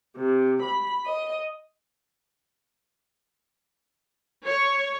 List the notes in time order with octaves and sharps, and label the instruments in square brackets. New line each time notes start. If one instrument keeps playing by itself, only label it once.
[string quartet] C3
B5
D#5
[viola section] C#5